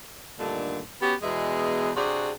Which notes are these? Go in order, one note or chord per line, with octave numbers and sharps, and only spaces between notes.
G2 A#2 D3 D#3 A3
B3 C#4 F#4 G4
E2 B2 G#3 G#4 E5
C3 D4 F#4 G#4